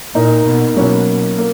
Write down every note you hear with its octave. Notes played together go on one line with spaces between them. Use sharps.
A#2 A#3 D#4 A#4
B2
B2 F#3 A#3 C#4
A#3